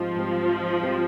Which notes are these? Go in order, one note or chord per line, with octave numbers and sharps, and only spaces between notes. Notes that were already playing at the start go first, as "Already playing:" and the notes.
Already playing: G#2 F3 G3 C4
G#2 G3 C4
G#2 G3 C4